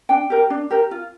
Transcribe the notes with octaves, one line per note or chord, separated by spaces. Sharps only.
D4 G5
G4 A#4
D4
G4 A#4
F4